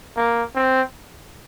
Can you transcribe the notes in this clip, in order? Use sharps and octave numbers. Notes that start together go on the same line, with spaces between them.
A#3
C4